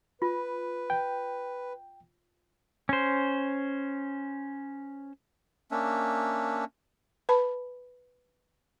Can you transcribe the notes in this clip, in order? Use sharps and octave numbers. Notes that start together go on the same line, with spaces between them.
F4 B4
G5
C#4 C5
A#3 C#4 D4 E5
B4 A5 B5